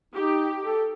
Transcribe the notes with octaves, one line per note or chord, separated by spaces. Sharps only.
D#4 G4
A4